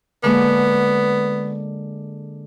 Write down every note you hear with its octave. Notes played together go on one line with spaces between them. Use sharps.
D3 G#3 A#3 B3